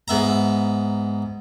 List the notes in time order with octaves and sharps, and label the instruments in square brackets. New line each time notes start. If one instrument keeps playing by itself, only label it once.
[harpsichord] G#2 B3 E5 A#5